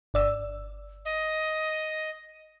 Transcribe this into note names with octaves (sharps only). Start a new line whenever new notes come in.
G1 D5 E6
D#5